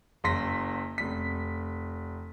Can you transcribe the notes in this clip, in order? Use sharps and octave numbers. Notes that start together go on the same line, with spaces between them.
F#1 F#2 C6 A#6 B6
F1 B6